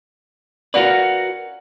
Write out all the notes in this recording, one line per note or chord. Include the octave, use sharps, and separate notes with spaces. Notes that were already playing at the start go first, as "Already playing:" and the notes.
C#4 F#4 A#4 B4 D5 F5 F#5